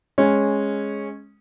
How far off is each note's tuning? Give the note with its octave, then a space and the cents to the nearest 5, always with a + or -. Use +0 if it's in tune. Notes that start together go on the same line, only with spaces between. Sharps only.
G#3 +0 C#4 -10